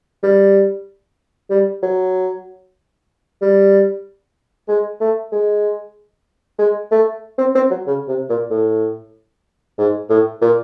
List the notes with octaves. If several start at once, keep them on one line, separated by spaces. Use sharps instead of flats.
G3
G3
F#3
G3
G#3
A3
G#3
G#3
A3
C4
C4
F#3
C#3
C3
A#2
A2
G#2
A2
A#2